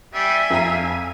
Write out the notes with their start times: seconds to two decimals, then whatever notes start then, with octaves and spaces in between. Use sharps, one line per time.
0.14 G3 E5 G#5
0.50 F2 F5 A#5